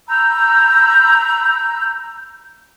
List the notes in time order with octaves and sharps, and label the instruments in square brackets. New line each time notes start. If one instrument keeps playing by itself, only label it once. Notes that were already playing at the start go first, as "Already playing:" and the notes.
[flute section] A#5 B5 E6 G6